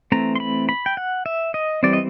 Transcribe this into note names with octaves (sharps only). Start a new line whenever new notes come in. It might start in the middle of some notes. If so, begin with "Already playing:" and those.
E3 A3 C4 A#5
C6
B5
B5
G5
F#5
E5
D#5
E3 G3 C4 D5
D#5